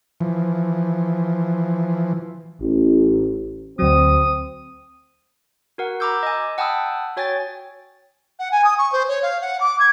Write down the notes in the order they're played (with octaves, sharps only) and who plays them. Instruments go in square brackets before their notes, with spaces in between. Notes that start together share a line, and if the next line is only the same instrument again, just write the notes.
[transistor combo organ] E3 F3
[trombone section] A1
[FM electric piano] D2 F#3 [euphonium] C4 [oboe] D#6
[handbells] F#4 A#4 F#5
A#5 B5 D6 E6 G6
D#5 G#5
F#5 G5 A5 B5 D#6 E6
F#4 C#5 G5 G#5 G#6 A6
[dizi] F#5
G#5
D#6
C#6
C5
C#5
F5
F#5
D6
G#6